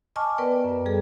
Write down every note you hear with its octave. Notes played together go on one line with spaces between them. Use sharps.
D#5 G#5 A5 C#6 D6 F6
B3 A#4 B4 D5 G5
F#2
G3 G#4 A4